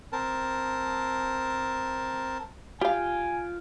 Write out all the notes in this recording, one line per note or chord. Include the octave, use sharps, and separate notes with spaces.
C4 A#4 A5
F4 G4 F5 G5 G#5